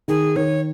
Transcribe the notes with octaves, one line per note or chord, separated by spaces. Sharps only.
D#3 G#4
D#3 C#5